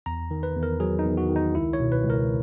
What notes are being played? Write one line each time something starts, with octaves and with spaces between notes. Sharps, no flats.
E2 A#5
D#3
B4
E2
A#4
F#3 G#4
D#4
E2
F#4
D#3
D#4
C#2 E4
C#5
B2
B4
C#2
A#4